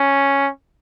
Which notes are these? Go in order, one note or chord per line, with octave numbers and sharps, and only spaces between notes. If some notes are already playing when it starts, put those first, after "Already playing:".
Already playing: C#4